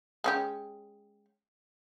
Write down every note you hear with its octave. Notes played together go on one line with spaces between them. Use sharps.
G#3 C#4 G4